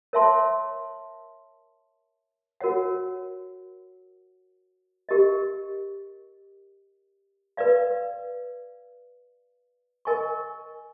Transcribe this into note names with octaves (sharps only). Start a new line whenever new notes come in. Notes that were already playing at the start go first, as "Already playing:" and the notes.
A#4 C#5 E5 A5 C6
F#4 A#4 C#5 F#5
G4 A#4 D#5
B4 D5 F5
A#4 D#5 G#5 C#6